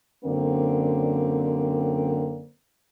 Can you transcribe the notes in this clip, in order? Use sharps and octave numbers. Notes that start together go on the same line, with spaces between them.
F#2 D3 A#3 C4